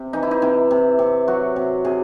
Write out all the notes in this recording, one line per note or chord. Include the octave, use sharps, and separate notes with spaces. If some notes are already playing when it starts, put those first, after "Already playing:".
Already playing: C3
E3 D#4
E4
D#4
C3 E4
C3
C3
F#3 F#4
C3
C3 G#4